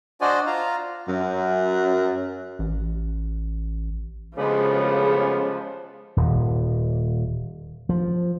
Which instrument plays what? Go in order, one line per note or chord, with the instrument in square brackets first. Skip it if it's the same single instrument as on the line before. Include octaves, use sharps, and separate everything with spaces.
[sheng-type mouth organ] D4 F#4 C5 D5 D#5 G#5
F4 F5 A#5
[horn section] F#2
[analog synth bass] A1
[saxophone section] D2 G3 B3 [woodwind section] C#3 [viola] F3 [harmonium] G#3
[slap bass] D#1
F3